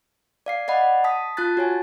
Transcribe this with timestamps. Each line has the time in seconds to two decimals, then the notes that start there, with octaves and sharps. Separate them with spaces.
0.46 D5 F5 C7
0.68 D5 D#5 F#5 B5
1.04 A5 D#6 B6
1.37 F4 A5 F#6 A6
1.57 F#4 C#5 G#5